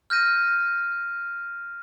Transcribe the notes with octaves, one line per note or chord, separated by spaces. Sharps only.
F6 G6 A#6 D#7